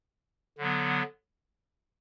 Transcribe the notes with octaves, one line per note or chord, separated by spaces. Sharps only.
D3 F#3 B3